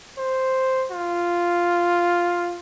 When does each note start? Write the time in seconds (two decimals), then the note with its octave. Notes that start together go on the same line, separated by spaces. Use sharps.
0.18 C5
0.91 F4